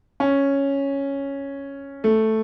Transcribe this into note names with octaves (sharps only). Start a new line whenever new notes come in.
C#4
A3